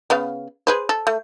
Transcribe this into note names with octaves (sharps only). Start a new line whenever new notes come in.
C#3 B3 F5
G#4 B4 C5
A4
A3